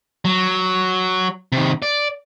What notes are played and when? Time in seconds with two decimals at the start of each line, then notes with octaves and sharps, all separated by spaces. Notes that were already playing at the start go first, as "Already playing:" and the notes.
0.25 F#3
1.52 C3 D#3
1.82 D5